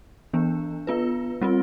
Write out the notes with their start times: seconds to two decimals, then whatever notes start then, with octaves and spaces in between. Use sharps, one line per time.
0.33 E3 B3 D4
0.87 B3 F4 B4
1.41 G3 C4 F4